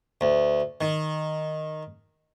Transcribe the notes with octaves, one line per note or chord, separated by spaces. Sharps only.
D2
D#3